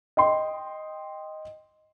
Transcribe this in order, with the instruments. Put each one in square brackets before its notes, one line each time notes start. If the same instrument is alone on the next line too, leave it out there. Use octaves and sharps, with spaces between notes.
[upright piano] D#5 G5 C6